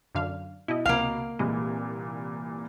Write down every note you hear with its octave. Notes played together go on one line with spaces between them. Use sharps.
F#2 D3 F5
B2 E4 D#5
C#2 C3 A#3 F5
C2 A#2 E3 G#3